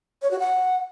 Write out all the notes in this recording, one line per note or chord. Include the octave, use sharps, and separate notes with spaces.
C#5
F#4
F#5